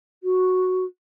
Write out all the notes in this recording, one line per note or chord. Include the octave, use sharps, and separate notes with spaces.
F#4